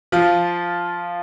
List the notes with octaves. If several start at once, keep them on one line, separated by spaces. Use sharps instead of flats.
F3 F4